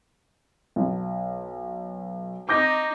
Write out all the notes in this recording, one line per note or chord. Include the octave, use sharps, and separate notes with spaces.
B1
D#4 D6 G6 A#6